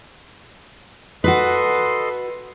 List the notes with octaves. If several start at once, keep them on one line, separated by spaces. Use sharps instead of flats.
F#4 A4 B4 D#5 C6